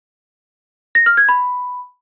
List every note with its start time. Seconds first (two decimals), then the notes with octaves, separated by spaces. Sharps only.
0.95 A#6
1.06 F6
1.17 G#6
1.29 B5